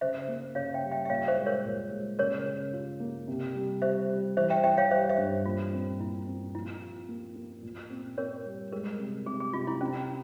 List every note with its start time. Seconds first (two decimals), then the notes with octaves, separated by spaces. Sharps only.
0.01 C#3 C5 E5
0.28 A#3
0.55 C#3 C#5 F5
0.74 E5 G5
0.83 G3
0.91 E5 G5
1.05 E5
1.10 A#2 C#5 F5
1.28 C5 E5
1.37 G#3
1.46 A#4 C#5
1.65 A#2
1.91 G#3
2.19 C#3 A#4 C#5
2.46 C#3
2.73 F4
3.00 A#3
3.28 C3
3.55 G3
3.82 G3 C5 E5
4.10 G3
4.37 E3 C5 E5
4.50 E5 G5
4.64 E3 E5 G5
4.77 C#5 F5
4.91 G3 C5 E5
5.09 C5 E5
5.18 G2
5.46 A#2 F4
5.73 C4
5.99 A#2 E4
6.27 C4
6.55 F3 E4
6.82 F4
7.09 A#3
7.36 A#3
7.63 A#2
7.90 C4
8.17 C4 A#4 C#5
8.46 G3
8.72 G#3 A#4
9.00 C3
9.26 C3 G#4
9.40 G#4
9.53 C3 F4
9.67 E4
9.81 C4 C#4